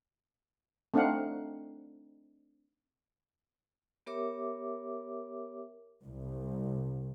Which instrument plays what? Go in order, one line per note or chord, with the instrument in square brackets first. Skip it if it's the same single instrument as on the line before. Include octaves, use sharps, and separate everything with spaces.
[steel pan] A3 C4 D4 D#4 F5 F#5
[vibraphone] B3 G4 A#4 C#5 E5 D6
[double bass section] C2